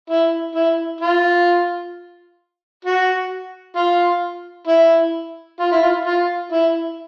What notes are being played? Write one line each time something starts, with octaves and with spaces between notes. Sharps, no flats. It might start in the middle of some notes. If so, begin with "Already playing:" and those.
E4
E4
F4
F#4
F4
E4
F4
E4
F4
F4
E4